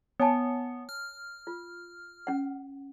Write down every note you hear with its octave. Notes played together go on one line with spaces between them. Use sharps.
B3 C#5 G#5 A5
F6
F4
C#4 F#5